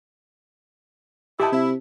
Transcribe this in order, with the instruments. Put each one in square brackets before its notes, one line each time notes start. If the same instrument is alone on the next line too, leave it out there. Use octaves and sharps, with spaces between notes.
[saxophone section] A#2 D#4 E4 [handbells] G4 A5
[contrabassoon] C3 [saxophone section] E4